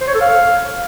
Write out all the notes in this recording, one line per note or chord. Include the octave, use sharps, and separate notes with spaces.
C5
C#5
A4
F5